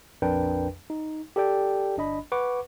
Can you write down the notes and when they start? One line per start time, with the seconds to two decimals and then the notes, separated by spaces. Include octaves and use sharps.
0.22 A#1 F2 D4 A#4 B4 G5
0.90 D#4
1.36 G4 A4 D5 G5
1.97 G1 D4 D#5 B5
2.32 B4 F#5 C#6 D6